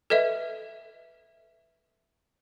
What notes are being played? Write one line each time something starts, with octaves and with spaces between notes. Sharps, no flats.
A4 B4 D#5 E5